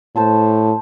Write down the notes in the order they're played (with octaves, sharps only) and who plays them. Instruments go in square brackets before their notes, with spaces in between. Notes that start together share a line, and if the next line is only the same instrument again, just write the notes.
[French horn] A2 [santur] C5 A5 E6